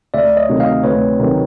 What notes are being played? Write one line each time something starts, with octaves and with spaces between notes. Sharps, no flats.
D2 D5 E5
C#5 D#5
C3 D#3 F#3 A3
D#5 F5
D2 B4 C#5
C3 D#3 F#3 A3